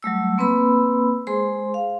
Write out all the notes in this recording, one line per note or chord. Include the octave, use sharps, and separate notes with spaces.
F#3 G3 A3 E6
A#3 C4 B4 B5 E6
G#3 G#4 C5 C6
F5